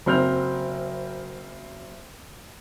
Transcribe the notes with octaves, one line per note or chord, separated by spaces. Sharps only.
F#1 F#3 C4 F6 G6 F7